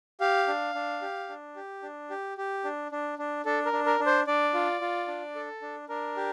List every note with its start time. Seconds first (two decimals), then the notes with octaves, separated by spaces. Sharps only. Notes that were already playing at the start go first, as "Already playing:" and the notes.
0.20 G4 F5
0.48 D4
0.75 D4
1.02 G4
1.29 D4
1.56 G4
1.83 D4
2.10 G4
2.38 G4
2.65 D4
2.92 D4
3.19 D4
3.45 D4 A4
3.66 A#4
3.73 D4
3.86 A#4
4.00 D4
4.06 C5
4.27 D4 D5
4.54 F4
4.81 F4
5.08 D4
5.35 A4
5.62 D4
5.89 D4 A#4
6.17 G4